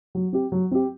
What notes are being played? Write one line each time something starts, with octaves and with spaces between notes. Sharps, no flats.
F#3
C4 G4
F#3
C4 G4